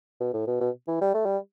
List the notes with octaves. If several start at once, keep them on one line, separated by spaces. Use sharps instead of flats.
B2
A2
B2
B2
E3
G3
A3
G3